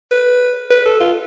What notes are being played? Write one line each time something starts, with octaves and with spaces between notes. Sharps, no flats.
B4
B4
A4
F4